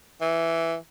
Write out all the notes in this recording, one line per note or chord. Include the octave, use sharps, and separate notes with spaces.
E3